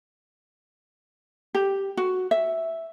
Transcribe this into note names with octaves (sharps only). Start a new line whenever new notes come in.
G4
F#4
E5